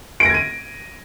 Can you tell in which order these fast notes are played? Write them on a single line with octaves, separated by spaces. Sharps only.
D7 A#6 G#6 D#7